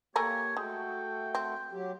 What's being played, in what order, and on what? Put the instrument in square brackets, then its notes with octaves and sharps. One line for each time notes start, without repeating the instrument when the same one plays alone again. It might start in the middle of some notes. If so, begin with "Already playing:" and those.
[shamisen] A3 A#4 G#5 [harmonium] A#3 G4 [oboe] C#5
[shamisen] G#3 [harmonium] A3 F#4 A4 [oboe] G5
[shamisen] C4
[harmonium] F#3 G4